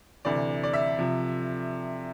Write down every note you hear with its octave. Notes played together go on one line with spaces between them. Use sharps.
D2 C3 E3 D5
D5
E5
C3 F3